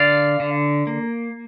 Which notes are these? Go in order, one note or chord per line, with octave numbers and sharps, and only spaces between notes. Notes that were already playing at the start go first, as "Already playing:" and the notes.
Already playing: D3 D5 F5
D3
A#3